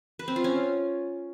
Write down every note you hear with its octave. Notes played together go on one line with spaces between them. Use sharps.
B4
C4
F4
C#4